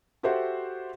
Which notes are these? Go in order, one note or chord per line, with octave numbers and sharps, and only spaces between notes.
F#4 G4 A4 C5 E5 F#5